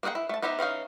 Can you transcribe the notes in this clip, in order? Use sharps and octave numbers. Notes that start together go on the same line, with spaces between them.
A#3 D4 G#4 F#5 G5
E4
A3 A5
B3 D#4 G4 C5 E5
E3 C#4 D#4 F5